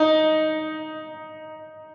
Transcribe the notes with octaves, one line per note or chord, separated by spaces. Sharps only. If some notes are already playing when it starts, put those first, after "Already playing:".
Already playing: D#4